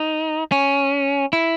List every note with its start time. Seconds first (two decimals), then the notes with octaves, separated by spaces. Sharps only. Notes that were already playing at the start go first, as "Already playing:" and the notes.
Already playing: D#4
0.52 C#4
1.33 E4